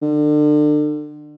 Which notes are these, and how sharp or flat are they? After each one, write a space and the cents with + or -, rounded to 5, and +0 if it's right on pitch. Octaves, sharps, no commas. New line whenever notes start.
D3 +30